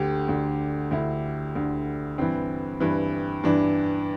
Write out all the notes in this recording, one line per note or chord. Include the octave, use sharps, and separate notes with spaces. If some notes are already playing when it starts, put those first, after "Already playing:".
Already playing: D2 D3 G4
D2 D3
D2 D3 E4
D2 D3
G2 E3 C4
G2 E3
G2 E3 D4